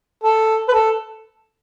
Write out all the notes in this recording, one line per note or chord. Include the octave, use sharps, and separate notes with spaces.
A4
B4
A4